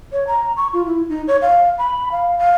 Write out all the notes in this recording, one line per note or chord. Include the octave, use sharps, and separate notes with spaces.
C#5
A#5
C#6
F4
E4
D#4
C#5
F5
B5
F5
F5